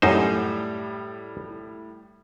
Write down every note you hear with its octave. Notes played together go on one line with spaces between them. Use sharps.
F#2 A2 G3 D#4 C5